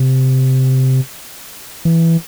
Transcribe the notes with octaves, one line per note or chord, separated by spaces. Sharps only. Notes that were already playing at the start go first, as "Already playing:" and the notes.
Already playing: C3
E3